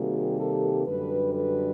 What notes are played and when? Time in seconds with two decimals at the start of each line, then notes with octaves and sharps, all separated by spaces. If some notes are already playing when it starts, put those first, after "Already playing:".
Already playing: C3 D#3 G3 A#3 F#4 G#4
0.39 G4 A4
0.87 F#2 D3 G3 A4 B4
1.34 A4 B4